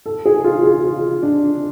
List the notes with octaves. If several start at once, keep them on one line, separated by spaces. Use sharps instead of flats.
A4
G#4
F4
G#4
F4
D4